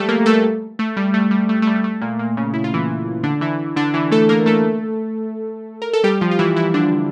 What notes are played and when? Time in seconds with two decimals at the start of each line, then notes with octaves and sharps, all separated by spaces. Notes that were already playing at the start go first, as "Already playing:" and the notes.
Already playing: F3 G3 A3 G4 A4
0.09 A#3 A#4
0.26 A3 A4
0.79 A3
0.97 G3
1.14 A3
1.31 G3
1.49 A3
1.62 A3
1.67 G3
1.84 A3
2.01 A#2 A#3
2.19 A#2 A#3
2.37 C#3 C#4
2.53 E4
2.64 F4
2.74 E3 E4
3.23 D3 D4
3.41 E3 E4
3.76 D3 D4
3.94 E3 E4
4.11 A3 A4
4.29 A#3 A#4
4.46 A3 A4
5.82 A#4
5.93 A4
6.04 G3 G4
6.21 F3 F4
6.31 F4
6.39 E3 E4
6.56 E3 E4
6.74 D3 D4